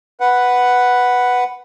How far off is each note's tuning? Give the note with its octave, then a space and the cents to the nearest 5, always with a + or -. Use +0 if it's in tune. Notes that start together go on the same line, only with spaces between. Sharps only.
B4 +0 F#5 +0